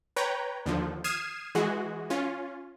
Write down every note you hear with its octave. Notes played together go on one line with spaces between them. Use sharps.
B4 C#5 G5 A#5
D#2 D3 F3
D#6 F6 G#6 C7 D#7 E7
E3 G#3 F#4 G#4
C#4 F4